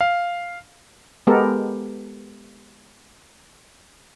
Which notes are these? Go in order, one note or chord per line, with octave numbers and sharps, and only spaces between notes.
F5
G#3 B3 G4 A4 A#4